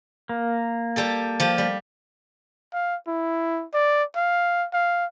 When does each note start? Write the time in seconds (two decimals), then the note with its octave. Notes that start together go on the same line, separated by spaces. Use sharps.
0.29 A#3
0.96 G3 G4 A4
1.40 F3 G4
1.58 G3
2.73 F5
3.08 E4
3.74 D5
4.16 F5
4.73 F5